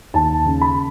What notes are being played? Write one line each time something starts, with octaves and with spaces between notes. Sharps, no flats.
D#2 A5
C#3
B5